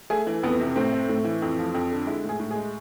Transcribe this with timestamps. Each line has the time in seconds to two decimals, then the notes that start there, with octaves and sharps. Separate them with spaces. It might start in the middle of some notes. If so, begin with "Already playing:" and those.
0.10 A3 G#4
0.27 E3
0.43 F2 B3
0.59 C3
0.76 A2 C4
0.92 A3
1.09 A2
1.25 E3
1.42 F2
1.58 F3
1.74 F2
1.91 D3
2.06 G#3 E4
2.24 A2
2.29 G#4
2.40 A2
2.51 G#4
2.56 G#3